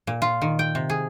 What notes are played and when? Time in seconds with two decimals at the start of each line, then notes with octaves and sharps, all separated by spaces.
0.07 A#2
0.22 F4
0.42 D#3
0.59 G5
0.75 C3
0.90 G#4